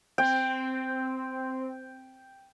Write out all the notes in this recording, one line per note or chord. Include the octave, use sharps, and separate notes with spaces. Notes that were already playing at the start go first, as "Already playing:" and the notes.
C4 G5